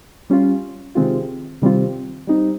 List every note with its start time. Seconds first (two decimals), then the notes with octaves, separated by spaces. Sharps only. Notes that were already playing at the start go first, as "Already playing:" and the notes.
0.30 G3 C#4 F4
0.95 C3 D#3 G#3 C4 F4
1.62 C3 D#3 G3 C4 F4
2.27 G3 C4 D#4